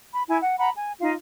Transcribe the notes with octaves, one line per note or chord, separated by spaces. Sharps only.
B5
E4 G#5
F#5
F#5 A#5 B5
G#5
D#4 F4 F5